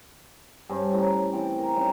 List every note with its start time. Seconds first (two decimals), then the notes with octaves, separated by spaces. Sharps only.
0.69 G2 C#4 C5
0.93 A2 A#5 B5
1.31 E3 C4 D6
1.58 A#4
1.75 G3 C#4 D#4